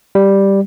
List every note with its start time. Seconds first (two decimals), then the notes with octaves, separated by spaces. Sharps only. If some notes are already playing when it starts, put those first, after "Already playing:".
0.15 G3